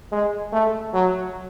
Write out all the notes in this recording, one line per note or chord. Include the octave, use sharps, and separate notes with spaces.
G#3
A3
F#3